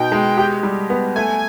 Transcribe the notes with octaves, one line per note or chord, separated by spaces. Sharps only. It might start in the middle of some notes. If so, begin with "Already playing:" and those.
Already playing: B2 D#4 G5
G#3
G4
G3
B3
A3 G#5